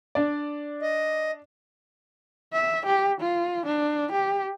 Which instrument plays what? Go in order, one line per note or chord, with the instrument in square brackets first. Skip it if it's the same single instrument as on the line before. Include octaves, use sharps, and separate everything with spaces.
[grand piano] D4 D5
[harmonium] D#5
[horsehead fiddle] E5
G4
F4
D4
G4